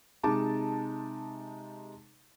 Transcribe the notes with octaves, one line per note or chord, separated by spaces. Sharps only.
C3 G#3 D#4 A5 D6